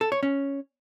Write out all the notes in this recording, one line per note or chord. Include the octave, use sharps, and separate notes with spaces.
A4
C#5
C#4